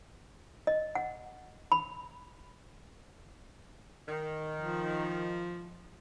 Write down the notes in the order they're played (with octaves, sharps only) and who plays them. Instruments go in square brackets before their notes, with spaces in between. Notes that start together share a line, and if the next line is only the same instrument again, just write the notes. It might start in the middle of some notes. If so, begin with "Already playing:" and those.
[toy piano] D#5
F#5
B5
[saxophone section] D#3
[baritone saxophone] F3